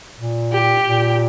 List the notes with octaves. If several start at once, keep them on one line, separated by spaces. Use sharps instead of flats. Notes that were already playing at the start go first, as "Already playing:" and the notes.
A#2
G4
A#2